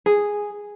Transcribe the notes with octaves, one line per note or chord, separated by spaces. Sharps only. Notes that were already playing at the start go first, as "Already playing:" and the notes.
G#4